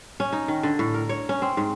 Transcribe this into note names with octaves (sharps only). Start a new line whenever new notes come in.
C#4
D#4
D#3
D3
A2
A#4
C#5
C#4
C4
G#2